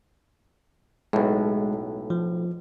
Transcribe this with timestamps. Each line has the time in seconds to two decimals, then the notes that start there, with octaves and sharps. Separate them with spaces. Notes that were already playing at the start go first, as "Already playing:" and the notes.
1.13 B1 A2 G#3
2.10 F3